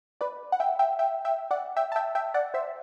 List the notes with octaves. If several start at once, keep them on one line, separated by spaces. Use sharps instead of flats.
B4 D5
F#5
E5 G5
E5 G5
E5 G5
E5 G5
D5 F#5
E5 G5
A5
E5 G5
E5 G5
D5 F#5
C5 E5